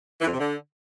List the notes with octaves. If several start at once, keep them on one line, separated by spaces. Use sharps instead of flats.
E3
F2
C3
D3